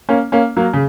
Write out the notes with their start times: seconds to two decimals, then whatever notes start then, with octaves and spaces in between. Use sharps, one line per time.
0.09 A#3 C#4
0.32 A#3 C#4
0.57 F#3 A#3
0.73 C#3